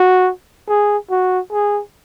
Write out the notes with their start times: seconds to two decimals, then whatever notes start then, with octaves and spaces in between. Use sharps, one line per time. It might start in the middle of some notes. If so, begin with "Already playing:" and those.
Already playing: F#4
0.68 G#4
1.10 F#4
1.52 G#4